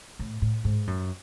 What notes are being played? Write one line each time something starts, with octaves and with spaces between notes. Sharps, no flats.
A2
A2
G#2
F#2